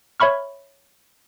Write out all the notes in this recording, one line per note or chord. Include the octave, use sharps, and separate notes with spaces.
C#5 E5 B5 C#6 F6